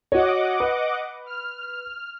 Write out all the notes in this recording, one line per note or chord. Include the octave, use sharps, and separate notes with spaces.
F#4 C#5 D#5 F#5 D6
B4
F6